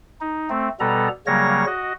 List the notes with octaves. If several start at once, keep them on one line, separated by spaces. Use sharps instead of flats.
D#4
A3 C4
B2 G3 B3 A4 A#5
C#3 F#3 G3 A#3 C#5 A#6
F#4 D#5